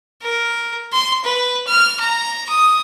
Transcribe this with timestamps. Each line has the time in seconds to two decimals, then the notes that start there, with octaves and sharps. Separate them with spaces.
0.22 A#4
0.92 C6
1.24 B4
1.67 F6
2.00 A#5
2.49 D#6